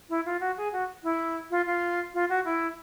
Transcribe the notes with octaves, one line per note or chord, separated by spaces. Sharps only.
E4
F4
F#4
G#4
F#4
E4
F4
F4
F4
F#4
E4